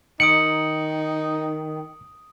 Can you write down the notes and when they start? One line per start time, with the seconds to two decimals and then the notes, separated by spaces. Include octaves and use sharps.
0.20 D#3 D#4 D#6 C#7 D7 F#7